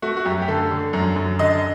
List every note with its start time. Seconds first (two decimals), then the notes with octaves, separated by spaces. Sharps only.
0.02 A3 F#4
0.17 F#4
0.25 F#2 G4
0.42 G4
0.48 D3 A4
0.71 D3
0.93 F#2
1.16 F#2
1.39 D3 D#5